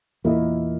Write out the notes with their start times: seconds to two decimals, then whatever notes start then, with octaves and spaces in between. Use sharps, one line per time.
0.24 E2 A#2 E3 A#3 E4 A#4 D#5